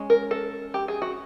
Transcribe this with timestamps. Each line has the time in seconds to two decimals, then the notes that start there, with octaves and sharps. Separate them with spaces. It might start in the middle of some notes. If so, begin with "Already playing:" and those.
Already playing: G#3 C#4
0.10 A#4
0.31 A4
0.74 G4
0.88 G#4
1.02 F#4